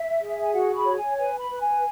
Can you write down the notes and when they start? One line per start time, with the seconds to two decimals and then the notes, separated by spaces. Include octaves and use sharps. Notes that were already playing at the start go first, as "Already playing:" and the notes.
Already playing: E5
0.21 G#4
0.42 G#5
0.53 F#4 F#5
0.75 B5
0.85 C#5
0.96 G#5
1.17 B4 G#5
1.39 B5
1.50 B4
1.61 G#5